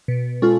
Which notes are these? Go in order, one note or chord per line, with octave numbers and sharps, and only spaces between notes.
B2
G#3 C#4 F4 A4